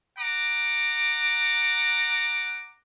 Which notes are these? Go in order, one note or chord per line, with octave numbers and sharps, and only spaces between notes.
F#5 A#5 D6